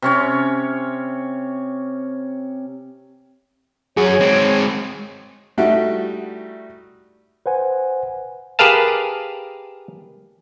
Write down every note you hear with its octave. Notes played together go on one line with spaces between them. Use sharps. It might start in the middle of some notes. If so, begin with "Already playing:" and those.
C3 C#4 C#5
F#2 F#4 G#4 C#5
G#3 C4
G3 A3 D#4 E4 F#4 G4
B4 C5 F#5 G#5
G4 G#4 A#4 B4 F5 A5